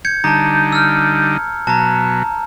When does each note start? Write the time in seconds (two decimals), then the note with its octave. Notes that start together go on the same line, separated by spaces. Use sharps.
0.05 G6 G#6 C#7
0.24 D3 G3 D#4 A5 A#5
0.72 E6 F6
1.67 B2 F#3 A5 A#5